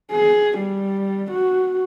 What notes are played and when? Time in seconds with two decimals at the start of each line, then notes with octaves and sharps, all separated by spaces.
0.11 G#4
0.58 G3
1.31 F#4